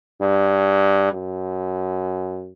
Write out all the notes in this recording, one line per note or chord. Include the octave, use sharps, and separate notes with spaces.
G2
F#2